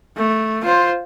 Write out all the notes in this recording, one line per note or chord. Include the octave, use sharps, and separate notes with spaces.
A3
F4 C5